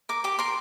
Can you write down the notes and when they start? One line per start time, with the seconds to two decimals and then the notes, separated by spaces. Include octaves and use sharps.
0.09 A#4 D6
0.24 G4 D6
0.39 A#4 C6